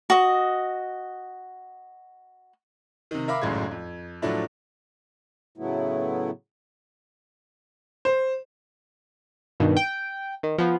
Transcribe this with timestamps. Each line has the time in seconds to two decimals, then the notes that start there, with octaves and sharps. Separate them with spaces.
0.10 F#4 D#5
3.11 C3 D#3
3.28 A#4 E5 F5 B5 D6
3.42 G#1 C#2 F#2 A2 G#3 G#6
3.71 F2
4.22 A2 F3 F#3 A3 D4 E4
5.58 A2 C#3 F#3 A3 B3 E4
8.05 C5
9.60 G2 B2 D#3
9.77 G5
10.43 D#3
10.58 F3 B3